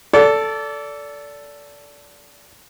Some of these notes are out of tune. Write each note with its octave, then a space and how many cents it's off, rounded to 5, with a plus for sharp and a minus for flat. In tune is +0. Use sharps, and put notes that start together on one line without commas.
A4 +5 D5 -25